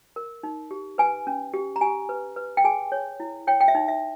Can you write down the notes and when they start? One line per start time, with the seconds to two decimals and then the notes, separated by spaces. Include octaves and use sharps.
0.16 A#4
0.43 D#4
0.71 G4
0.98 B4 G#5
1.27 C#4
1.54 G4
1.76 A#5
1.81 G4 G#5
2.09 B4
2.36 B4
2.57 G5
2.64 G#4 G#5
2.92 C#5
3.20 E4
3.47 C#5 G5
3.61 G5
3.68 E5
3.75 D#4
3.88 E5